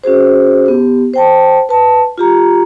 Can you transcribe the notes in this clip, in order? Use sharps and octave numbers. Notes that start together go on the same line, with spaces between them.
C#4 F#4 G#4 C5
B3 G4
C5 G5 A5
B4 A5
F4 G4 A#5